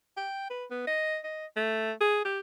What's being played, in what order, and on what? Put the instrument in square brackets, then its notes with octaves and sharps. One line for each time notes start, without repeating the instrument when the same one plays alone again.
[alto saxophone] G5
B4
B3
D#5
D#5
A3
G#4
G4